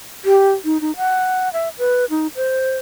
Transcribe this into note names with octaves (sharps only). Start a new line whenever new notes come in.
G4
D#4
D#4
F#5
E5
B4
D#4
C5